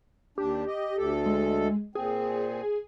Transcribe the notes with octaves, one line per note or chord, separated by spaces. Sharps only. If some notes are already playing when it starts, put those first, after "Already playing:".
D#2 D4 G4
D#5
D2 A4
G#3
A#2 C4 G#4